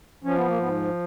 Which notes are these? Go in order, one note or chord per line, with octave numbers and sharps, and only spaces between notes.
F3 C#4
B3
A#3
G#2 B3